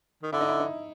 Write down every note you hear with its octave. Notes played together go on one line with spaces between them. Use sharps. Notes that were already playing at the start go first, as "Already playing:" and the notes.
D#3
D3 E4
D#4
E4
D#4